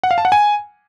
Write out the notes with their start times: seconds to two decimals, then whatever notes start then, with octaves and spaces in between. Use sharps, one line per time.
0.03 F#5
0.11 F5
0.18 A5
0.25 F#5
0.32 G#5